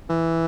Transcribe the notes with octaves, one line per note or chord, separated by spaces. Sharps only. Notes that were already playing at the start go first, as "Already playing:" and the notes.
E3